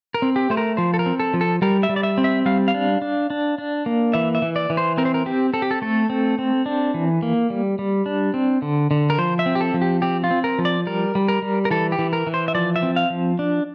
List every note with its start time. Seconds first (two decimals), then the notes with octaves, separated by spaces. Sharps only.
0.14 A#4
0.22 C4
0.36 G4
0.50 A3 C5
0.57 A#4
0.77 F3 C5
0.94 A4
0.99 A#4
1.06 C4
1.20 A4
1.34 F3
1.41 A4
1.62 G3 A#4
1.83 E5
1.89 G3
1.96 D5
2.03 E5
2.18 C4
2.24 E5
2.46 G3 F5
2.68 F5
2.74 D4
3.02 D4
3.30 D4
3.58 D4
3.86 A#3
4.13 E3 E5
4.35 E5
4.42 E3
4.56 D5
4.70 E3
4.77 C5
4.98 C4 A#4
5.05 C5
5.14 A#4
5.26 C4 G4
5.53 C4 A4
5.62 G4
5.71 A4
5.82 A3 A4
6.10 C4
6.39 C4
6.66 D4
6.94 E3
7.22 A#3
7.50 G3
7.79 G3
8.06 D4
8.34 C4
8.62 D3
8.91 D3
9.10 A#4
9.18 F3 C5
9.39 E5
9.46 C4
9.55 G4
9.61 A4
9.74 F3
9.82 G4
10.02 C4 G4
10.24 F4
10.31 C4
10.44 A#4
10.59 F3
10.65 D5
10.87 G3 A#4
11.15 G3
11.28 A#4
11.42 G3
11.65 A#4
11.71 E3 A4
11.92 G4
11.99 E3
12.13 A#4
12.27 E3
12.34 C5
12.48 E5
12.54 F3 D5
12.76 E5
12.83 C4
12.96 F5
13.10 F3
13.39 D4